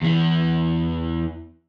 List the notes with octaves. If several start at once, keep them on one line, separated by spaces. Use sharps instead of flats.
E2 E3